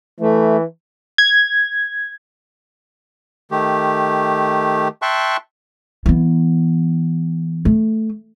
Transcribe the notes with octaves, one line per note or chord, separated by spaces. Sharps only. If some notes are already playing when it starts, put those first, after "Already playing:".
E3 A3
G#6
D#3 A3 G4
E5 G5 A5 C6 C#6 F#6
E3 B3
A3